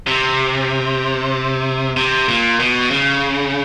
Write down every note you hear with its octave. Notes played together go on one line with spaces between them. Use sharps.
C3
C3
A#2
B2
C#3